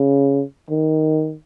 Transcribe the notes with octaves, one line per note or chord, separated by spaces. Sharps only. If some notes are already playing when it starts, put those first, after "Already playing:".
Already playing: C#3
D#3